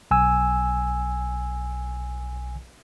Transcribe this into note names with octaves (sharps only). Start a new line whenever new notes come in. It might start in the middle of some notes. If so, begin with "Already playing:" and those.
B1 G#5 E6